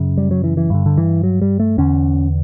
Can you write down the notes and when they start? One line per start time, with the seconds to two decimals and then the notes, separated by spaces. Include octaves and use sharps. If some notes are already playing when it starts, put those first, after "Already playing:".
Already playing: F#2 C#3
0.17 G3
0.31 F#3
0.44 E3
0.57 E3
0.70 G2 D3
0.86 D3
0.98 E3
1.23 F#3
1.41 G3
1.59 A3
1.78 E2 D3 C#4